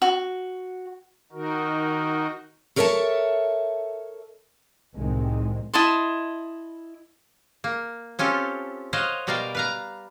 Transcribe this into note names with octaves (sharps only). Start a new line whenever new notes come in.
F#4
D#3 D#4 F#4 A#4
A4 A#4 C#5 E5 G#5 A5
C2 A2 C3 D#3 G#3 C4
E4 D#5 A5 C6
A#3
C4 C#4 F4 G4 A4
C5 C#5 D#5 F5 F#5
B2 G3 A#4 D5 F5 G5
B4 F5 A#5